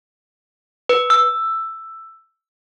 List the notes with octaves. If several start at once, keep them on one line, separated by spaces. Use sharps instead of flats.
B4
E6